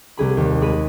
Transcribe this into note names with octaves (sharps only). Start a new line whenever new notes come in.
C2 G#4 B5
D#2
G#3 B5 D#7